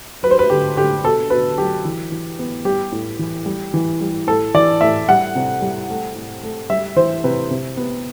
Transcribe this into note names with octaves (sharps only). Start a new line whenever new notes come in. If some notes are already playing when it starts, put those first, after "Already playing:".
F#3 B4
C5
B4
D3 G4
D3 G4
B2 A4
B2 B4
F#3 G4
E3
E3
B3
G3 G4
A2
E3
G3
E3
G3
A2 A4
E3 D5
A2 E5
G3 F#5
C3
G3
A3
A2
A3
G3 E5
E3 C5
C3 B4
C3
B3